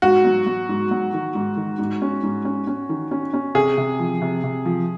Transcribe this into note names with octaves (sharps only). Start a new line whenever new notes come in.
G#2 F#4
F#3
F#3
G#2
F#3
D#3
G#2
D#3
G#2
C#4
G#2
C#4
C#4
D#3
C#4
C#4
C3 G#4
C3
F3
C3
C3
F3